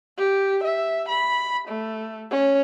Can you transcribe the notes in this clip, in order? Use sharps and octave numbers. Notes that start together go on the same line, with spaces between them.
G4
E5
B5
A3
C#4